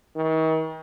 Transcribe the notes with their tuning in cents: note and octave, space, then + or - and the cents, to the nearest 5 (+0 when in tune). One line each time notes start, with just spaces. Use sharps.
D#3 +40